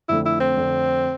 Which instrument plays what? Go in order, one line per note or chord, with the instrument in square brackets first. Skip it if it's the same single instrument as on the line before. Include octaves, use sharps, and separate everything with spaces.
[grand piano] F2 D3 A3 D4 [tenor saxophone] E4
[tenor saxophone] E4
C4
[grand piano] F2 D3 A3 D4